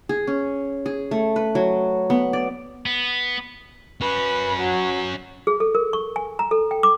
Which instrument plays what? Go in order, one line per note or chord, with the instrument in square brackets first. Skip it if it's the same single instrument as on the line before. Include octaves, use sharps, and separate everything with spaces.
[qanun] G#4
C#4
G#4
A3
B4
F#3
B3
D5
[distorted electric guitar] B3
[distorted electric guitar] C#4 F#4 [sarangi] B4
[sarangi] F#3
[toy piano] G#4
A4
A#4
C#6
G#5
A#5
A4
G5
D6